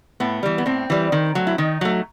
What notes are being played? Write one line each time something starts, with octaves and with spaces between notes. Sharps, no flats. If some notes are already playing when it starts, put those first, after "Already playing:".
A2 B3
E3 G3
B3
A2 C4
E3 G3
D#3
F#3 A3
E4
D#3 D#4
F#3 A3